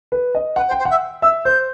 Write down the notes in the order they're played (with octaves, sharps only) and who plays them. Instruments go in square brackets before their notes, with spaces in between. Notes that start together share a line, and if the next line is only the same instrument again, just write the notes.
[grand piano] B4
D#5
[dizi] B4 [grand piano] F#5
[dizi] C5
[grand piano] G5
[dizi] C5
[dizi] E5 [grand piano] F#5
[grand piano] E5 [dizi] E6
[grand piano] C5 [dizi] G6